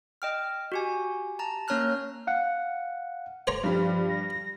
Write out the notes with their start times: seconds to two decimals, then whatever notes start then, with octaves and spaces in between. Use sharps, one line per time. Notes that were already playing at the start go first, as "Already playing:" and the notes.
0.22 D#5 G5 F6
0.72 F#4 G4 G#5
1.39 A5 A#5
1.68 A#3 C#4 C#5 A#5 F6 F#6
2.27 F5 F#5
3.47 C5 C#5 A#5
3.64 G2 F3 G3
4.09 A#6